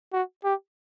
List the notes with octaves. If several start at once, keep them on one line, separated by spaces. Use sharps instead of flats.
F#4
G4